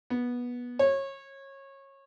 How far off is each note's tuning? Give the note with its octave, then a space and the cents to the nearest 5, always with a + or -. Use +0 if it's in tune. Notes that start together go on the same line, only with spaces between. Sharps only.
B3 -15
C#5 -25